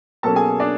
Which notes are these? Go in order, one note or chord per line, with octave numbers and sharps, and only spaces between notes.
B2 F#3 A#3 C#4 A4 A5
G#4 G#5
D4 D5